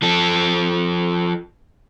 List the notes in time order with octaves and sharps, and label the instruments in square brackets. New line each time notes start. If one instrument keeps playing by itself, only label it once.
[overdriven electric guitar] F3 A4